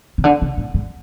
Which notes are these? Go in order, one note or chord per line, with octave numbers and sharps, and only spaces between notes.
C#3
D3
C#3
A2
G#2